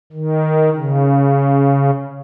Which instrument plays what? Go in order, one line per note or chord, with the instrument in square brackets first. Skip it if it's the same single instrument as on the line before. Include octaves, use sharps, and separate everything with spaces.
[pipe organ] D#3
C#3